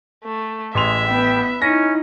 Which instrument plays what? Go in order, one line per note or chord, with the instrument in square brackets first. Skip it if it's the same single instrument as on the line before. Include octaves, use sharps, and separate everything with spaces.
[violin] A3
[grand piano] A1 C6 F7 [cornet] G#3 [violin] E5
[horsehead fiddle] B3 B4 [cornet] G5
[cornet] C#4 [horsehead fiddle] D#4 E4 [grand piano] A#6